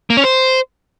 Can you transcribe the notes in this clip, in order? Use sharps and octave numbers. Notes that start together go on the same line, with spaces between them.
A#3
C#4
C5